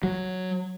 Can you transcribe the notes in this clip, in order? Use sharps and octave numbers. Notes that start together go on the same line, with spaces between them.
F#3